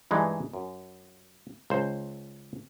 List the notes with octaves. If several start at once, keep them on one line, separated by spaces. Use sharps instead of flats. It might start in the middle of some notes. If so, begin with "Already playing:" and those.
G2 E3 G#3 A3 D#4
F#2
C#2 C5